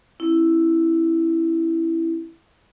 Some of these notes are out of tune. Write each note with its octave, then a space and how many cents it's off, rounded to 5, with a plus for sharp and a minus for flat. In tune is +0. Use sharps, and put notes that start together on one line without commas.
C#4 -45 E4 +0